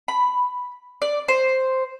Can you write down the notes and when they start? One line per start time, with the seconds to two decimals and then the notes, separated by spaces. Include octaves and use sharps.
0.08 B5
1.02 D5
1.28 C5